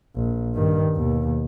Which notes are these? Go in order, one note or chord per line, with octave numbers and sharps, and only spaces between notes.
A#1
G2 D#3
D#2 B2